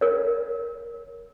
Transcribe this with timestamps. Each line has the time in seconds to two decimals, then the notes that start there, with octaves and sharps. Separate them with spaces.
0.01 A#4 C#5